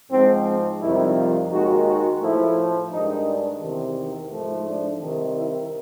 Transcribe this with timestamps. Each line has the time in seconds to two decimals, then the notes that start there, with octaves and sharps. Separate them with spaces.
0.11 G#2 F3 G#3 C4
0.81 F2 C3 D#3 G3 E4
1.16 F4
1.51 D#2 D#3 G#3 F#4
1.87 F#4
2.21 A2 F3 A3 E4
2.91 G2 D#3 G#3 D#4
3.26 D4
3.61 E2 C3 D#3
4.31 G#2 F3 A3
4.66 D4
5.01 C2 C3 D#3
5.36 E4